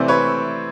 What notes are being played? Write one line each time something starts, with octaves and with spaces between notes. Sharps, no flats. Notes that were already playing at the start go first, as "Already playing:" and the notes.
Already playing: C3 E3 A3 C4 C5 D5
B4 C#5